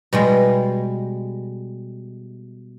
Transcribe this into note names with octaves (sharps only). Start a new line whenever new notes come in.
B2 G3 G#3